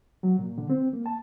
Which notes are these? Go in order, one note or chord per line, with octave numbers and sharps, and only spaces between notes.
F#3
A#2
D3
C4
A#3
A5